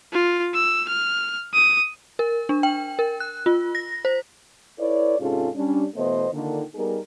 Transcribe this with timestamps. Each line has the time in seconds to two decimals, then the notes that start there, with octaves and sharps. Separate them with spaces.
0.13 F4
0.54 E6
0.88 F6
1.54 D#6
2.19 A#4
2.49 D4
2.63 G5
2.99 A#4
3.20 F#6
3.46 F4
3.75 A#6
4.05 C5
4.79 E4 A4 B4 C#5 D5
5.20 G#2 C3 C#4 F4 G#4 A4
5.55 G3 C#4 D4
5.95 B2 E3 A3 B3 C5 D#5
6.32 A#2 D3 D#3
6.75 G3 B3 D#4 G#4 A#4